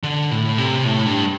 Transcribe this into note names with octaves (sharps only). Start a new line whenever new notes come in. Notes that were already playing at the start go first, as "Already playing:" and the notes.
D3
A2
C3
A2
G2